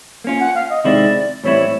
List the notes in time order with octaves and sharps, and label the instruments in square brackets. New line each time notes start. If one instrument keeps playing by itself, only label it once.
[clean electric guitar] A#3 C#4 F4
[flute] F#5
F5
D#5
[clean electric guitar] C3 D#3 G#3 C4 E4 [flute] D5
[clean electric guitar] A2 E3 G3 C4 E4 [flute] C#5